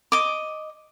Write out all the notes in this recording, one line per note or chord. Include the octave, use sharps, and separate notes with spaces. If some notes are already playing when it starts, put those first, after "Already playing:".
D#5 D6